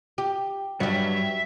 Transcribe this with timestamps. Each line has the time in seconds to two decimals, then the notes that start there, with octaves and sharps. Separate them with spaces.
0.18 G4
0.80 G2 F#3 G3 E5